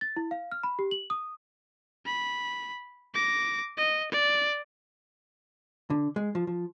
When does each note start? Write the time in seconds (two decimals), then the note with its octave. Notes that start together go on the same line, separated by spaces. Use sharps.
0.01 A6
0.16 E4
0.31 F5
0.52 F6
0.63 B5
0.79 G4
0.91 F#7
1.10 D#6
2.06 B5
3.14 D6 A#6
3.77 D#5
4.12 D5
5.90 D3
6.16 G#3
6.35 F3
6.47 F3